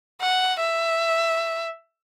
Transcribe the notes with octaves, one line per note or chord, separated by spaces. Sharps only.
F#5
E5